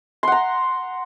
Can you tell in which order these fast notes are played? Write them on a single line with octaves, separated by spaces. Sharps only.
C6 F#5 A#5